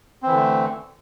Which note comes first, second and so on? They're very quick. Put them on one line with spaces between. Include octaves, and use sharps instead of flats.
C4 E3 D3 A3